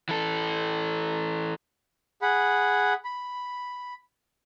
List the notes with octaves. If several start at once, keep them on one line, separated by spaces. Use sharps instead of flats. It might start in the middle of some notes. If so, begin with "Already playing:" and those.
E3 A4
G#4 F#5 B5
B5